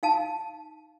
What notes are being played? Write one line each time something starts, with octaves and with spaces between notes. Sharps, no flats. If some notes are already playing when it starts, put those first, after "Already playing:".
D#4 F5 A5